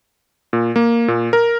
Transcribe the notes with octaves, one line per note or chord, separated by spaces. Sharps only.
A#2
A#3
A#2
A#4